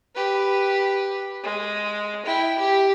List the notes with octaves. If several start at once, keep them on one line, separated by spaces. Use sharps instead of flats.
G4 B4
G#3
E4 G5
G4